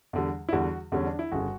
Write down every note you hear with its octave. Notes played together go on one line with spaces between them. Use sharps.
E2 D3 G3
E4
E2 D3 G3 F#4
E2 D3 G3 C#4
D4
E4
G1 C#3 F#4